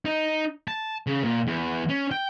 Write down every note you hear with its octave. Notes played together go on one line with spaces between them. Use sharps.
D#4
A5
C#3
A#2
E2
C#4
G5